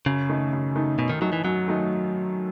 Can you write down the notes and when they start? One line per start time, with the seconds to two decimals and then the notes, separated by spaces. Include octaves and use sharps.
0.06 F#2 C#3
0.30 D#3 A3 D#4
0.53 F#2
0.76 D#3 A3 D#4
0.98 F#2 B2
1.10 D#3
1.21 D#3 F#3 A3 D#4
1.33 E3
1.45 F#2 F#3
1.68 D#3 A3 D#4